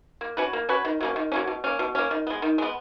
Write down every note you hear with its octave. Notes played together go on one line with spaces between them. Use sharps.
A#3
C#4 F#4 B4
A#3
C#4 F#4 B4
D#3
F#3 A#3 C#4
D#3
F#3 A#3 C#4
B2
A#3 C#4
B2
A#3 C#4
D#3
G#3 B3
D#3
G#3 B3